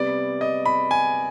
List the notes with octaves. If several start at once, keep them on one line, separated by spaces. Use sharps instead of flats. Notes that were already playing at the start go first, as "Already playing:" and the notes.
Already playing: C3 G3 B3 D5
D#5
B5
G#5